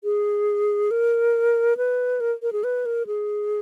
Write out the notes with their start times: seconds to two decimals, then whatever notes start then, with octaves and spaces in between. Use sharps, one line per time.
0.04 G#4
0.91 A#4
1.77 B4
2.20 A#4
2.42 A#4
2.53 G#4
2.64 B4
2.86 A#4
3.07 G#4